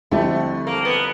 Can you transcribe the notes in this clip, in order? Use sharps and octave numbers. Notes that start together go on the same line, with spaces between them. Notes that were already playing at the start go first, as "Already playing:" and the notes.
F2 D3 G3 A3 C4 E4
A#3
B3